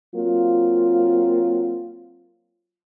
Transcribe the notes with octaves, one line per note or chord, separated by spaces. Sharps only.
F#3 A#3 C4 F4